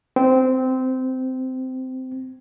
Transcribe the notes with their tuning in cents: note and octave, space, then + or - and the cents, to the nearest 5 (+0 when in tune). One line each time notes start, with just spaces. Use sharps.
C4 -15